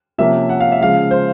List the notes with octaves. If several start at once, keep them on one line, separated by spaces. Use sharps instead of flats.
C3 F3 A#3 C#4 E5
F#5
F5
E5
C#3 F3 G#3 F5
C5